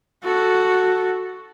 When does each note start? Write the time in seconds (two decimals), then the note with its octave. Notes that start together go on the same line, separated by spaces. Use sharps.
0.24 F#4 A4